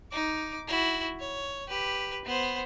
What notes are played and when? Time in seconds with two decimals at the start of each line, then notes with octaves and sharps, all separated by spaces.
0.12 D#4 D6
0.68 E4 F#4
1.20 C#5
1.68 G4 B4
2.25 B3 C5